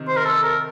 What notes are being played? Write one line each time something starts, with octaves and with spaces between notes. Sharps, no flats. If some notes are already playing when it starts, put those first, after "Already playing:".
Already playing: C3 D#3
C5
A#4
A4
A#4